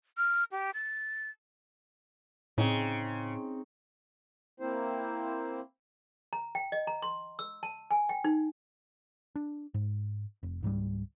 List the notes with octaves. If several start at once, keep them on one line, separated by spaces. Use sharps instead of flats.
F6
G4
A6
A2 C#3 C4 D#4
A#3 C4 E4 C5
A#5
G5
D#5
A#5
C6
E6
A5
G#5
G5
D#4
D4
G#2
F1
C#2 G#2 F#3 G3